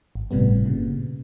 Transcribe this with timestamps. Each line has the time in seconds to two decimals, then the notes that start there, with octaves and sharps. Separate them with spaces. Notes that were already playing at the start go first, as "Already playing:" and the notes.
0.15 G#1
0.31 G1 A2 C3 G3 B3
0.66 A#2 C#3